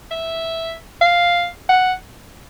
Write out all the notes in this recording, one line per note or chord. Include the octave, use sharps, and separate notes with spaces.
E5
F5
F#5